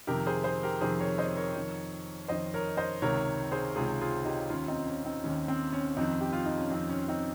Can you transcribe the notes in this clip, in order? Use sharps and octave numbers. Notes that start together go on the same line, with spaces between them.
F2 C3 D#3 G4 A#4
G#4 C5
G#4 C5
G4 A#4
F2 C3 D#3 G#4 C5
A#4 C#5
C5 D#5
A#4 C#5
F2 D#3
F2 D#3 C5 D#5
A#4 C#5
C5 D#5
C#2 C3 D#3 A#4 C#5
G#4 C5
C#2 C3 D#3 F4 G#4
F4 G#4
D#4 G4
D#2 D#3 C#4 F4
C4 D#4
C#4
C4 D#4
D#2 D#3 C#4
C4
C#4
F2 D#3 C4 D#4
G4
F4
D#4
C#4
F2 D#3 C4
C#4
C4 D#4